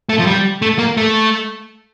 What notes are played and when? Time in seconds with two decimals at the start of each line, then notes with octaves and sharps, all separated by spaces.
0.09 A3
0.19 F3
0.26 G3
0.62 A3
0.79 A#3
0.97 A3